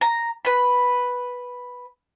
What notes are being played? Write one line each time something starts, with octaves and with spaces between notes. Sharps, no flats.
A#5
B4 B5